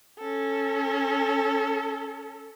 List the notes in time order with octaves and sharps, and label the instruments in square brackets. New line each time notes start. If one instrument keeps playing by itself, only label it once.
[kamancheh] C#4 A4